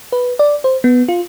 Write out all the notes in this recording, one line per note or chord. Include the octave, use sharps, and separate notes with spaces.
B4
D5
C5
B3
F4